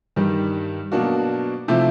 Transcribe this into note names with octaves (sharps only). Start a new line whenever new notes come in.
G2 D#3 G3
B2 F#3 A#3 D4 F#4
C3 F3 A3 C4 E4